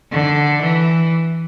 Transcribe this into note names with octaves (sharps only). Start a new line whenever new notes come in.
D3
E3